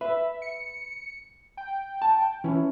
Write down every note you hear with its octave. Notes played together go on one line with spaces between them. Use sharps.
B4 E5
C#7
G5
A5
E3 C#4 E4